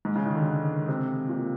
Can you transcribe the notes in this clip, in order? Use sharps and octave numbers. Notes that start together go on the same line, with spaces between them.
G#2
C#3
D#3
D3
C#3
C3
A#2